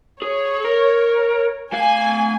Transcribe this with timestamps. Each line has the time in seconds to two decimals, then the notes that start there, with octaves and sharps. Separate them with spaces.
0.22 G#4 C#5
0.65 A#4
1.73 A3 F5 G#5